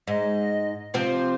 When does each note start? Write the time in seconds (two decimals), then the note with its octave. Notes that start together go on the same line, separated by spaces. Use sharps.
0.07 G#2 D#5
0.94 C3 F3 C4 C5